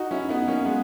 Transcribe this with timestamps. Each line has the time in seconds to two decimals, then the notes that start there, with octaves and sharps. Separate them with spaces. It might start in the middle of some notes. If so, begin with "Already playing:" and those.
Already playing: D#4 F#4
0.11 C#4 E4
0.29 B3 D#4
0.47 A#3 C#4
0.66 G#3 B3